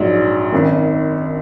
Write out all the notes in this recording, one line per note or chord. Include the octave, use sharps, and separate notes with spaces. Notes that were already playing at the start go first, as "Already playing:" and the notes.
Already playing: A#1 G#2 F#3
G#1 F#2 D#3